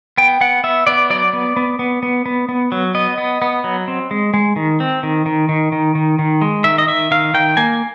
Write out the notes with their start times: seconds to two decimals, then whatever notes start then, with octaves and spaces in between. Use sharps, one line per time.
0.18 B3 G5
0.41 B3 F#5
0.64 B3 E5
0.87 B3 D5
1.10 F#3 D5
1.33 B3
1.57 B3
1.79 B3
2.03 B3
2.26 B3
2.49 B3
2.72 F#3
2.95 B3 D#5
3.18 B3
3.42 B3
3.64 F#3
3.88 C4
4.11 G#3
4.34 G#3
4.56 D#3
4.80 C4
5.03 D#3
5.26 D#3
5.49 D#3
5.72 D#3
5.95 D#3
6.19 D#3
6.41 G#3
6.64 D#3 E5
6.78 D#5
6.88 D#3 E5
7.11 D#3 F5
7.34 D#3 G5
7.57 A#3 G#5